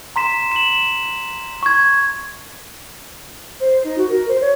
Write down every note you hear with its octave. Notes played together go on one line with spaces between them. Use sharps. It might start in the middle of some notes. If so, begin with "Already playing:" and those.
A#5 C6 B6 E7
E7 F#7
C#6 G#6
C5
D#4
F#4
A#4
C5
C#5